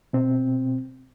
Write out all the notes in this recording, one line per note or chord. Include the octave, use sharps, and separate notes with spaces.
B2 C4